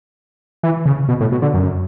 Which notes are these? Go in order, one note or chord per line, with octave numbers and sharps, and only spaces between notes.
E3
C#3
B2
A2
B2
D3
F#2